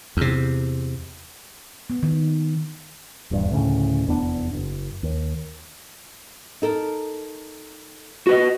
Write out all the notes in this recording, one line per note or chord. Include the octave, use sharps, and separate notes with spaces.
E2 C3
B3
D#3
D#1 E2 G2
D2 A2 C#3
F1 E2 B3 D4
F#1
D#2
D#4 A4 A#4
F#4 B4 D#5